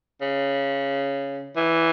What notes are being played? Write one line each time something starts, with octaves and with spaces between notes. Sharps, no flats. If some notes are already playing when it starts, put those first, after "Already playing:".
C#3
E3